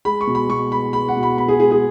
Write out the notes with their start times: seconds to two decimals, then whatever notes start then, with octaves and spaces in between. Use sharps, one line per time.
0.05 G#3 B5
0.21 C#6
0.27 B2
0.35 B5
0.49 B2 C#6
0.71 G#3 B5
0.93 G#3 B5
1.08 F#5
1.16 B2
1.23 B5
1.38 B2 B5
1.48 G#4
1.60 G#3 G#4
1.71 G#4